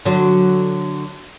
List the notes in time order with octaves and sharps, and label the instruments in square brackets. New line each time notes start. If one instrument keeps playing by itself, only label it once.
[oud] D3 F#3 F#4